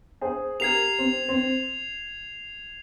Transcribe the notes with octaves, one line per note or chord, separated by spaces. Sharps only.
G#4 C5
G4 A#4 G#6 C7 F7
C4
C4